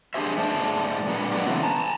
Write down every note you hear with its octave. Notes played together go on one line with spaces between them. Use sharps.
D4 G4 G#4 C5 E5
G#2 G#3 A3 C5 D5 A5
A#2 F#3 B3 D4
G#2 A#3 D4 F#4 G4
C#3 E3 A3 B3 C4
A5 A#5